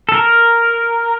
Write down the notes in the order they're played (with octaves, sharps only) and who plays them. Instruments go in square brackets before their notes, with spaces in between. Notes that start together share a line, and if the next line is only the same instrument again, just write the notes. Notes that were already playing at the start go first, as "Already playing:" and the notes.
[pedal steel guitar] A4
A#4